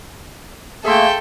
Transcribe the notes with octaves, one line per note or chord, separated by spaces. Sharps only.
A3 A#3 G#4 A4 E5 G5 C6